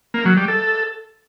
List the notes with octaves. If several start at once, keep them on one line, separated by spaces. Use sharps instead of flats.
A#3
F#3
G3
A4